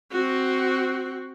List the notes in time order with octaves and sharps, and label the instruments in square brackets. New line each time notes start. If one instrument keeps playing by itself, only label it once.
[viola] C4 F#4